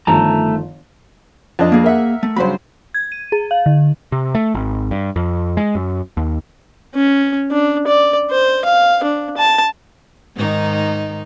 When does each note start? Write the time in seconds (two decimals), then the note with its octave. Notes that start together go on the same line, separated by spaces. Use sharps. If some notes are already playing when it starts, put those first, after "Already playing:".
0.07 G1 D#3 F3 A3 A5 A#5
1.59 F2 D4 D#5
1.72 A#3 G#4
1.84 A#4 E5 F#5
2.23 A3
2.36 G2 C#3 F#3 C5 B5
2.94 G#6
3.12 D#7
3.32 G#4
3.51 F5
3.66 D3
4.12 C3
4.35 A3
4.54 G#1
4.91 G2
5.16 F2
5.57 G#3
5.75 F#2
6.17 D#2
6.94 C#4
7.51 D4
7.88 D5
8.31 C5
8.65 F5
9.03 D4
9.37 A5
10.36 G#2 D#3 D#4